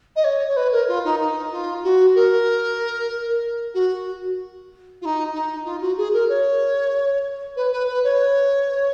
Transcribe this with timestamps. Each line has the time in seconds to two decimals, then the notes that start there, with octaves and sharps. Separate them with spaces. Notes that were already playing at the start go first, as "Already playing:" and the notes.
0.15 D#5
0.24 C#5
0.47 C#5
0.56 B4
0.72 A#4
0.88 F4
1.04 D#4
1.20 D#4
1.51 F4
1.83 F#4
2.15 A#4
3.74 F#4
5.01 F4
5.05 D#4
5.33 D#4
5.65 F4
5.81 F#4
5.97 G#4
6.13 A#4
6.29 C#5
7.56 B4
7.72 B4
7.88 B4
8.04 C#5